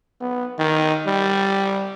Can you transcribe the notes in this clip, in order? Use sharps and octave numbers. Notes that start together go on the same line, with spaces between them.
B3
D#3
G3